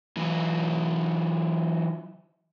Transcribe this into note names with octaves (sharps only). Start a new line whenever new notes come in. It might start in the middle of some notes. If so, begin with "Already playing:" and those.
E3 F#3